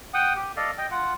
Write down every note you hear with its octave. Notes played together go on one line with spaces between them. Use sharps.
F#5 G5 D#6
G4
A4 D5 D#5 F5
D#5 G5
F4 F#5